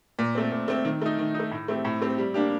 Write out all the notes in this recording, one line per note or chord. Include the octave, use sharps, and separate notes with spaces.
A#2
A3 C4
A#2
A3 C4
D#3
A3 D#4
D#3
D#4
A3
A2
A3 C4 G4
A2
A3 C4 G4
G3
A#3 D4 G4